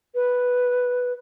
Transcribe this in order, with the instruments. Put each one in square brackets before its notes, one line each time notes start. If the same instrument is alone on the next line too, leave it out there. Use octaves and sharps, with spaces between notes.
[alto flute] B4